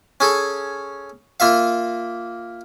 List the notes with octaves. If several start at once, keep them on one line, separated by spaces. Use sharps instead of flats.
C#4 G#4 A4
A#3 F4 E5 F5